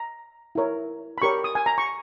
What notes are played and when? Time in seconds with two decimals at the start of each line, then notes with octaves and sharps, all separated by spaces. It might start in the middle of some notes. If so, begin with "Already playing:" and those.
Already playing: A#5
0.55 E4 A#4 C#5
1.18 B5
1.22 G4 A#4 C#5 C#6
1.44 D#6
1.55 G#5
1.66 A#5
1.78 C#6